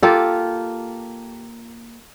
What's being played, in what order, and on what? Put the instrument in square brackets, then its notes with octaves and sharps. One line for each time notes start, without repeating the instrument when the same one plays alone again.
[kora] A#3 F4 G4 A4